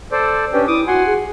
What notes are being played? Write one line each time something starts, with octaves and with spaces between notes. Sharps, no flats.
A4 C5 D5
C#4 D4 G4 B4
E4 D6 D#6
F#4 F#5 G#5 C6
G#4